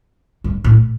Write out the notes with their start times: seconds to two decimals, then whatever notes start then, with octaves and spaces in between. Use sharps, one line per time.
0.44 G2
0.64 A2